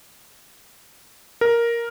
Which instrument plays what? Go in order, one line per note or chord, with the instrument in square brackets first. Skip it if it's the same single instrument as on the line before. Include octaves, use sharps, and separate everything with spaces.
[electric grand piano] A#4